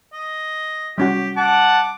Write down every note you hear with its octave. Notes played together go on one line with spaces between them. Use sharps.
D#5
G3 C#4 F#4 G4
F#5 A5 D6